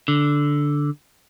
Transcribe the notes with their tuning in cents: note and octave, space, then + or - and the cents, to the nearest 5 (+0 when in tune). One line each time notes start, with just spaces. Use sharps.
D3 -5